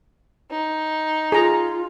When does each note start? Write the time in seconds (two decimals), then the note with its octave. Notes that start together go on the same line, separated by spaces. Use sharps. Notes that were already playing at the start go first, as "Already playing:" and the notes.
0.51 D#4
1.32 F4 G#4 A#5